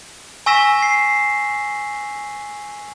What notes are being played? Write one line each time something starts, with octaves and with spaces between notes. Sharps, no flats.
G#5 C#6 E6 A#6 B6 E7
C7